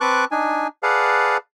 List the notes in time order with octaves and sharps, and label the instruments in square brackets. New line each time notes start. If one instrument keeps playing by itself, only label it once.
[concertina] C4 B4 A5 C#6 D6 F#6
D4 D#4 G#5
G#4 B4 D5 F5 F#5 A5